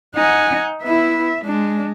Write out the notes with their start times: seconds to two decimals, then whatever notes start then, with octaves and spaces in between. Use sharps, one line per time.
0.16 D#4 F#5 G#5
0.83 B3 E4 E5
1.45 G#3 D4